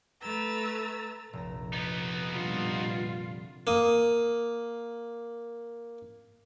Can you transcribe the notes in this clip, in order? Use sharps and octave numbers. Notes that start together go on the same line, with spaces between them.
A3 B4 A#5 E6 A6
F1 A#1 A#5
B3 D#4
A#2 D3 G3 F4
A#3 D#6